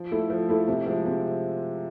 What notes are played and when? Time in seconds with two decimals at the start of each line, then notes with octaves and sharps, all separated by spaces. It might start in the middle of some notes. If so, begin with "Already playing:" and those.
Already playing: F3
0.11 A3 E4 A4
0.30 F3
0.49 A3 E4 A4
0.68 C3
0.86 F3 G#3
1.06 C3